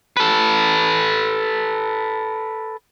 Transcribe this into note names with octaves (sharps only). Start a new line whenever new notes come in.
A4 B4